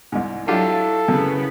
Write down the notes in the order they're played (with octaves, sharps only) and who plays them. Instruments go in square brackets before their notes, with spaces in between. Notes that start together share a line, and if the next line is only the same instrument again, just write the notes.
[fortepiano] C2 G#2
[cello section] F#3 [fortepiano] D4 F4 G4 [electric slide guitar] E4 F5 [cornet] A4
[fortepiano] F#2 [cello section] C#3 B3